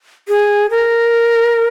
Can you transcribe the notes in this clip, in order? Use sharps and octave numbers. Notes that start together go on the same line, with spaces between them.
G#4
A#4